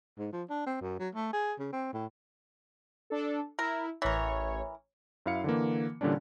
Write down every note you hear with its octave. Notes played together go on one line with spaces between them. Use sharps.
G#2
F3
D4
C4
F#2
F#3
A3
G#4
C#3
C4
A2
D4 A4
E4 A#4
A1 E3 A#4 C#5
F#2 E4 F5 C#7
D3 E3 A#3
A#2 D3 E3 G3 C#4 D4